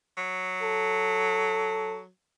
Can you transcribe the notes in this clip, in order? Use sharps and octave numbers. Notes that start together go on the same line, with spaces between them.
F#3
A4